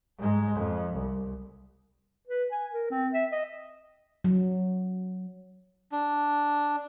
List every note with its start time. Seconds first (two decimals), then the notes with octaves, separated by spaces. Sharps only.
0.19 G#2 G#3
0.56 F2
0.95 C2
2.27 B4
2.51 G#5
2.72 A#4
2.90 C4
3.13 E5
3.32 D#5
4.24 F#3
5.92 D4